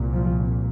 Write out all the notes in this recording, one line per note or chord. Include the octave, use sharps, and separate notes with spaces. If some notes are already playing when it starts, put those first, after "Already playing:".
Already playing: C2 A#2
F3